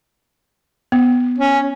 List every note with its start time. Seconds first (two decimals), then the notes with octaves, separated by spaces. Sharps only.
0.92 B3
1.38 C#4